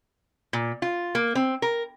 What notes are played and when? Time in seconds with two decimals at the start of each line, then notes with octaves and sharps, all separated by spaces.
0.53 A#2
0.82 F4
1.15 A#3
1.35 C4
1.62 A#4